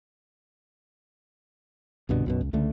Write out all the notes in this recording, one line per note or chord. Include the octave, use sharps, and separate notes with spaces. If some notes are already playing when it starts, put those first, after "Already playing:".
C2 G2 B2 D3
B1 F#2 B2
C#2
C#2 D3 A3